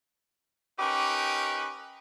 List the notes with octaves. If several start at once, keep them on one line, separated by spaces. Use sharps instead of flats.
C#4 D#4 G4 A#4 B4